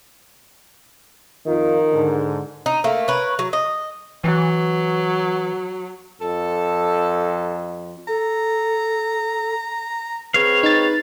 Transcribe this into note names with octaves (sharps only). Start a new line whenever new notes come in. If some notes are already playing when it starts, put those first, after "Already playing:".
F2 D#3 D#4 F4
G#2 D3
D#4
A3 A#3
A#4 B4 C#5
F#3
D#5
E3 F#3
F2 A4
A4 A#5
C4 G#4 B4 C#5 F5
D#4 A6